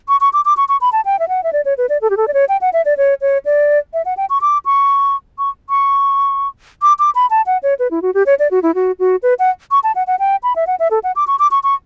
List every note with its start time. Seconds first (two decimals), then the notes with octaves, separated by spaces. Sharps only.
0.08 C#6
0.21 C#6
0.33 D6
0.45 D6
0.57 C#6
0.69 C#6
0.81 B5
0.92 A5
1.05 G5
1.19 E5
1.29 F#5
1.44 E5
1.53 D5
1.65 C#5
1.78 B4
1.89 D5
2.02 A4
2.10 G4
2.17 A4
2.28 D5
2.34 C#5
2.49 G5
2.61 F#5
2.73 E5
2.85 D5
2.97 C#5
3.21 C#5
3.45 D5
3.94 E5
4.05 F#5
4.17 G5
4.30 C#6
4.41 D6
4.65 C#6
5.38 C#6
5.70 C#6
6.82 D6
6.99 D6
7.15 B5
7.30 A5
7.46 F#5
7.63 C#5
7.79 B4
7.91 E4
8.02 F#4
8.14 G4
8.26 C#5
8.39 D5
8.51 F#4
8.63 E4
8.75 F#4
8.99 F#4
9.23 B4
9.39 F#5
9.71 C#6
9.84 A5
9.95 F#5
10.07 F#5
10.19 G5
10.43 B5
10.56 E5
10.67 F#5
10.80 E5
10.91 A4
11.04 F#5
11.16 D6
11.27 C#6
11.39 D6
11.51 C#6
11.63 C#6